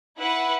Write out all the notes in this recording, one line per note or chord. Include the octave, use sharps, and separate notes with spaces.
E4 B4 F#5